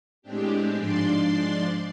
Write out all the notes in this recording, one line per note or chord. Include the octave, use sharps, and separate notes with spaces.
A2 G#3 C4 D4 G4
G#2 F3 D4 D5 C6